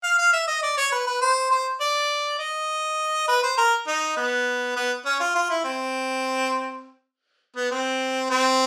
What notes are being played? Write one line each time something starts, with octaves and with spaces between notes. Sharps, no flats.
F5
F5
E5
D#5
D5
C#5
B4
B4
C5
C5
D5
D#5
B4
C5
A#4
D#4
B3
B3
C#4
F4
F4
E4
C4
B3
C4
C4